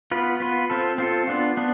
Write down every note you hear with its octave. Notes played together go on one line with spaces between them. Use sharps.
B3 F4 B4
B3 F4 B4
C4 F4 A4
C4 F4 A4
B3 D4 F4
B3 D4